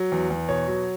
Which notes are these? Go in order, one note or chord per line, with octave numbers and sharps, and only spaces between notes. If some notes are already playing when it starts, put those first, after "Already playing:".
Already playing: F#3
E2
E2
B2 C#5
F#3